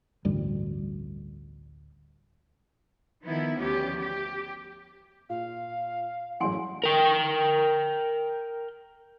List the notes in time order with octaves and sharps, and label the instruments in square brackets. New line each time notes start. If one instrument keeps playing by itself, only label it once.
[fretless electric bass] A1 D2 G2 G3
[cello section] D#3 F3 B3 E4
D2 F3 B3 C#4 G4
G4
[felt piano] A#2 [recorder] F5
[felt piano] F#2 A2 E3 [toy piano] F#5 G#5 C6
[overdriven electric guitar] A#4 G5